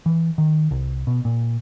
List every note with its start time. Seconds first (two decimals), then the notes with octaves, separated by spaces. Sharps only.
0.06 E3
0.38 D#3
0.71 C2
1.07 B2
1.25 A#2